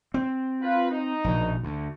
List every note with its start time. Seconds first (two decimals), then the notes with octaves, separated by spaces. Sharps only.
0.14 C4
0.61 F4 B4
0.90 D#4
1.24 A#1 B2
1.63 D2